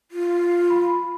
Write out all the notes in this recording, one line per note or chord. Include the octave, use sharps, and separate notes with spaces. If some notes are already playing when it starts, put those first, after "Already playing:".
F4
B5